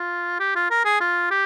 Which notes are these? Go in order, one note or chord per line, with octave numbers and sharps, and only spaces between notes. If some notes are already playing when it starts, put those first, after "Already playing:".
Already playing: F4
G4
F4
A#4
G#4
F4
G4